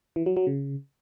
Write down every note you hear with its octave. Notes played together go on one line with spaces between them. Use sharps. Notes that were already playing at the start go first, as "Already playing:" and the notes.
E3
F#3
F#3
C#3